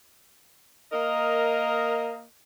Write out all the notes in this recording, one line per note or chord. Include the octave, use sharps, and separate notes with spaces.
A#3 A#4 D#5